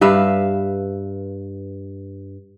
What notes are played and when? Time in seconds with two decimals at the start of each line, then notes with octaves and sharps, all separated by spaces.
0.01 G2 B4 E5 F5